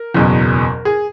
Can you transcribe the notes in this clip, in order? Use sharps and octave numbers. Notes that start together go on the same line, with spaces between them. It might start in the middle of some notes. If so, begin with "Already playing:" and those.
Already playing: A#4
F#1 E2 B2
G#4